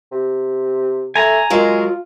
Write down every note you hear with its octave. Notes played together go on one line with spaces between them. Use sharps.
C3
A3 G#5 A#5
F#3 G#3 F4 A#4